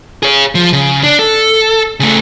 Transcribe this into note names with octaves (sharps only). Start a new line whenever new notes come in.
G#4 C#5
F3
C#3
D4
A4
C#3 A3